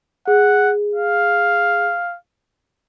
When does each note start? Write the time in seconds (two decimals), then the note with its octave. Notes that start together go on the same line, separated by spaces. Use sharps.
0.28 G#4 F#5
0.95 F5